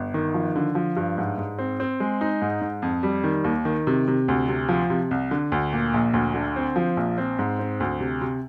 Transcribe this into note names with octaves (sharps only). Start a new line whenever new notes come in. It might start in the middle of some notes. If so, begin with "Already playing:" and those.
Already playing: G1
D#3
F3
D3
F3
G2
G#2
G#2
C4
C4
G#3
D#4
G#2
G#2
F2
G3
D#3
D#2
D#3
C3
C3
D2
C3
F3
C3
C2
D3
D2
A#2
A#1
D2
D3
C4
F3
A#1
C4
G#2
C4
D2
C3
C3